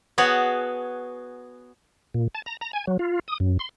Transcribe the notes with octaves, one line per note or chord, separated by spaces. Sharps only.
B3 F#4 G#4 C#5 A5
A#2
A5
A#5
A#5
G#5
F#3
F4
D#6
F#2
C6